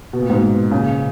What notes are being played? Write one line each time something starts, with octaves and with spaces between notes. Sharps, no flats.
B2
A#2
G#2 B2
A#2 C#3